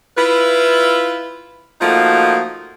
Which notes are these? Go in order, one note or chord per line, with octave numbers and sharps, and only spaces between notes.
E4 F4 B4
F3 A3 A#3 D#4 F4 F#4